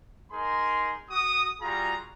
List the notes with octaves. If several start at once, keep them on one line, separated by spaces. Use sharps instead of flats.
D#4 G#4 A#4 C6
F#4 D#6
G3 F4 F#4 G#4 A#5